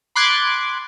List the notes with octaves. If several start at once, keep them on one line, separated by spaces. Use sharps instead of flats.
B5 C6 D6 F#6 G#6 A6